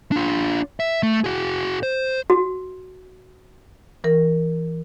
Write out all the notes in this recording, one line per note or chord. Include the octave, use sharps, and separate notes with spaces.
D4 F4
E5
A3
F#4 G#4
C5
F#4
E3 A#4